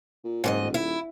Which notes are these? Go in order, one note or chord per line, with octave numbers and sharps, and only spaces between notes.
A#2
F#1 G#2 A#4 D#5
D#1
E4